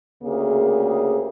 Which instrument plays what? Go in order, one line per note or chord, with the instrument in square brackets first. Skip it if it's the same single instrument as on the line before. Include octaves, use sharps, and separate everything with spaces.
[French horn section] D2 C#3 A#3 G4 G#4